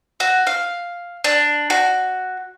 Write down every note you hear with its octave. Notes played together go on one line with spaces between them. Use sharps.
F#4
F5
D4
F#4